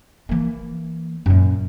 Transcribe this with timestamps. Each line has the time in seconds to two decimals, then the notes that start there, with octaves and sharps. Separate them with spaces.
0.29 E3 A#3
1.26 F#2 A#2